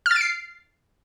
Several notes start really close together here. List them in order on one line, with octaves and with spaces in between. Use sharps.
F6 A6 D7 C7